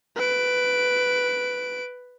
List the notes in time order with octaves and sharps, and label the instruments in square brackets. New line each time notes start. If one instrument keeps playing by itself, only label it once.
[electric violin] B4 D7